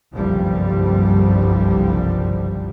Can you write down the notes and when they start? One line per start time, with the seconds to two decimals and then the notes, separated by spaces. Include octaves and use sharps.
0.14 F#1 C2 G2 D3 F3 G3